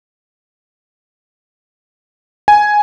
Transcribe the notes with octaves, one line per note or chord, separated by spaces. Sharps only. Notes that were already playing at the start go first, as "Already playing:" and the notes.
G#5